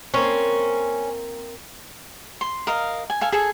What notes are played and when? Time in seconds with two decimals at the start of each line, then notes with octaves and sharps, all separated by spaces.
0.14 A#3 C4 C#4
2.41 C6
2.67 A#4 D#5 F5
3.10 G#5
3.21 A4 F5 G#5
3.32 G#4 A4 G#5